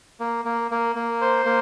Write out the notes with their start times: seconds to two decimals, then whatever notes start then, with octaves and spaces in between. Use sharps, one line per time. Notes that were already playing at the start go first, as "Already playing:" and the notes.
0.20 A#3
0.45 A#3
0.71 A#3
0.96 A#3
1.21 C5
1.45 A#3